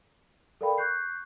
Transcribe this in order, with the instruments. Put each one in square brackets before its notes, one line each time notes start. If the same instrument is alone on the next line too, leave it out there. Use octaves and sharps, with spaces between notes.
[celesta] A4 A#4 D5 F5 G5 B5
C#6 F#6 G6 C7